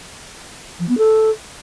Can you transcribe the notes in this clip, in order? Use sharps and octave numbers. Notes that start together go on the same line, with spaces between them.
F3
B3
A4